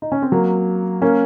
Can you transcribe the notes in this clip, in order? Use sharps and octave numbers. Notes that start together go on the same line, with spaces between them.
D#4
C#4
C4
F#3 A#3
A#3 C#4